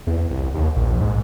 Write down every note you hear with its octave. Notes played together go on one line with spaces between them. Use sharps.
E2
C2
D#2
A#1
G#2